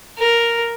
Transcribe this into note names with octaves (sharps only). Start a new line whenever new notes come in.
A#4